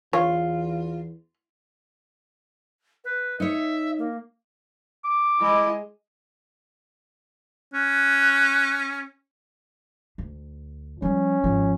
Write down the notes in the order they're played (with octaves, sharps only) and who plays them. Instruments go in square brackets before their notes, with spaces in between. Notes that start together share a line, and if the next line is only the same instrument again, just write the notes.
[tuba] E2 [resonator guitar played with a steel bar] F4 [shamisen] C#5
[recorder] B4
[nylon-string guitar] D#4 C#5 [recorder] E5
[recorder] A#3
[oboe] D6
[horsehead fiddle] G#3 D#5 [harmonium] E4
[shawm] C#4 [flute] F#6
[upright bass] D2
[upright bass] F3 G3 [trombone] C#4
[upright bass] G#1 F3